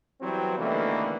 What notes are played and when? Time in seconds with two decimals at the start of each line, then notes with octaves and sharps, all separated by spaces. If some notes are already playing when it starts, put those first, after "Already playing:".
0.21 E2 E3 F#3 G3 C4
0.58 D#2 B2 D3 E3 A3 A#3